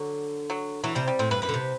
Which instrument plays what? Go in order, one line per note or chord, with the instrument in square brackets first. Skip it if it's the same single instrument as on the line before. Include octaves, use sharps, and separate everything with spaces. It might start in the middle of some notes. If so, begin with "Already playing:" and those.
Already playing: [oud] D3 [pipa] F#3
[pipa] F#3
[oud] E3 [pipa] F#3
[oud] C3 [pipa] G3
[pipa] G3
[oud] A2 [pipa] C4
[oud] G2 [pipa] B4
[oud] F#2 [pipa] B4
[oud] D3
C3